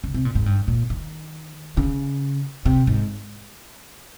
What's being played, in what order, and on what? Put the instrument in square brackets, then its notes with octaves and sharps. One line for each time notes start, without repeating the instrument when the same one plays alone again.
[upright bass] C#3
C3
A#2
G#2
G2
A#2
D#3
C#3
C3
G#2